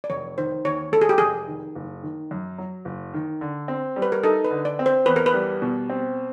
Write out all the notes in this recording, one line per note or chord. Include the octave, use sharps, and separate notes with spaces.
D5
F1 C#5
D#3 C5
D#2 C#5
G#3 A4
G#4
G4
F1 G#4
D#3
F#1
D#3
F#2
F#3
F#1
D#3
D3
C4
G3
B4
A#4
D#4 A4
B4
D3
D5
C4
C5
E2 B4
A#4
B4
G3
B2
C4